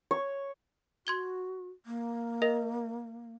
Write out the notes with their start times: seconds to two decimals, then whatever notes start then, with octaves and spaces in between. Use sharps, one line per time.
0.11 C#5
1.07 F#4 C6 G#6 G7
1.86 A#3
2.42 A#4 D#5 A#6